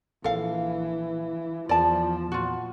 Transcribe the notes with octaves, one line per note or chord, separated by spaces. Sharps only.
A#1 E3 A4 F5
E2 F3 D5 A5
A#2 F4 F#4